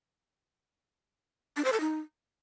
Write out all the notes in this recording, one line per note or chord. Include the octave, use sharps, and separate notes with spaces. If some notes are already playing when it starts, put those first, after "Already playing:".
D4
C5
A4
D#4